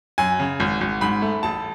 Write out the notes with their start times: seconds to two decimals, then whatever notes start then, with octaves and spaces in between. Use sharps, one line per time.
0.18 F#2 G#5
0.40 C#3
0.60 G#1
0.81 G#1
1.01 G#2 B5
1.22 A3
1.43 A1 A5